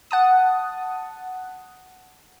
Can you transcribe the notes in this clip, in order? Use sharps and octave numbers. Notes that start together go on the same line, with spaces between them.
F#5 A5 D#6